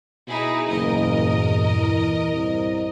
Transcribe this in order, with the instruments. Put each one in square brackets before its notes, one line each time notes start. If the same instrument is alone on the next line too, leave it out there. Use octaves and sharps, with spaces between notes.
[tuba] B2 [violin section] D#4 E4 G#4
[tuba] F#1 [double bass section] E2 G2 A#2 [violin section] A#4 D#5
[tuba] E3
C2